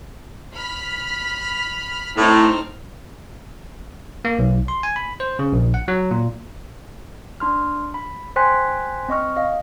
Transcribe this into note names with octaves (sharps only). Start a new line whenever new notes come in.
B5 F6 B6
A2 C4 D#4 F6
A#3
B1
C6
G#5
B5
C5
C#3
A#1
F#5
F#3
A#2
D4 C6 F6
B5
C5 G5 G#5 C6 F#6 B6
C4 D#5 C#6 F6
D#5 F5